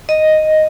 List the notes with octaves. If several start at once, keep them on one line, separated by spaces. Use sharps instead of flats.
D#5